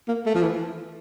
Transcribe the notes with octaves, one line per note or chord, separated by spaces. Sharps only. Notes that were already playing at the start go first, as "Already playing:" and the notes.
A#3
A3
F3
E3